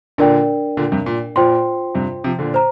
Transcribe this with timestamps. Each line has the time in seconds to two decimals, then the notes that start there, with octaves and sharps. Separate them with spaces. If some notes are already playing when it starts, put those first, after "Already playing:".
0.18 A#2 D3 D4 A#4 D5 G5
0.77 A#2 D3
0.92 G2 C3
1.06 A#2
1.36 A#2 F4 C5 G5 C6
1.95 G2 C3
2.24 C3 F3
2.39 A#2 D3
2.54 C5 A#5